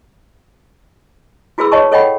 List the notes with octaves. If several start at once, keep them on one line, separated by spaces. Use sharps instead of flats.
E4 F#4 G#4 B4 B5 E6
C#5 D#5 A5 C#6
A4 C#5 D#5 F#5 G5 B5